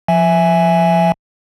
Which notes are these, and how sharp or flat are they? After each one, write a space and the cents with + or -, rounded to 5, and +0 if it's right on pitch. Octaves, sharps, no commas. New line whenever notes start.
F3 +0 E5 +0 G#5 +0